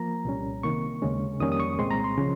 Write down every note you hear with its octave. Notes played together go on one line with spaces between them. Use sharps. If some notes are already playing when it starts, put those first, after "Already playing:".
Already playing: F3 A#3 A#5
C2 A#2 G3 C#4
C3 D#3 A#3 C#6
D#2 C#3 G#3 C#4
F2 D#3 G3 A#3 C#4 D#6
D#6
C#6
C2 A#2 G#3 C4 C6
A#5
C6
C#3 F3